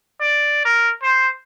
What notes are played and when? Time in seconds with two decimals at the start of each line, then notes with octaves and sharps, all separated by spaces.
0.21 D5
0.65 A#4
1.03 C5